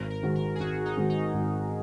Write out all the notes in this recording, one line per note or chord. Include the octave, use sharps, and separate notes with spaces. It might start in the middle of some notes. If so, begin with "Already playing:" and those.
Already playing: G#1 A#4
A#4
G#2 D#3 G#3 F#4
A#4
G#4
G#1 F#4
D#4
G#2 D#3 G#3 F#4
D#4
G#1